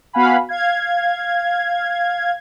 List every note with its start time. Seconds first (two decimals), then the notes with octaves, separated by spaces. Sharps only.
0.13 B3 F#4 F5 F#5 G#5 B5
0.49 F5 G#6